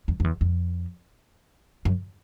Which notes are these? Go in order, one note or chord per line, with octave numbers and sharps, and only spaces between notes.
E2
F2
E2
F2
F#2